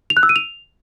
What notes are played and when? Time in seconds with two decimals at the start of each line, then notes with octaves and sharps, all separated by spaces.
0.10 F7
0.17 F#6
0.23 E6
0.29 D#7
0.36 F7